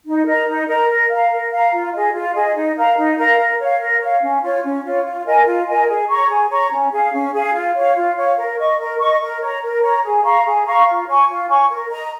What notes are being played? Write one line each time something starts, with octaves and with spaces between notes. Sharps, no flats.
D#4
A#4 D#5 A#5
D#4
A#4 D#5 A#5
A#4
F5 A#5
A#4
F5 A#5
F4
G#4 D#5
F4
G#4 D#5
D#4
A#4 F5 A#5
D#4
A#4 F5 A#5
A#4
C#5 F5
A#4
C#5 F5
C#4
F4 C#5
C#4
F4 C#5
F4
A#4 D#5 G#5
F4
A#4 D#5 G#5
G#4
C#5 A#5 C#6
G#4
C#5 A#5 C#6
C#4
G#4 F5
C#4
G#4 F5
F4
C#5 F5
F4
C#5 F5
A#4
D#5 C#6
A#4
D#5 C#6
A#4
C#5 A#5
A#4
C#5 A#5
G#4
F5 A#5 C#6
G#4
F5 A#5 C#6
F4
C#5 G#5 C#6
F4
C#5 G#5 C#6
A#4
D#5 A#5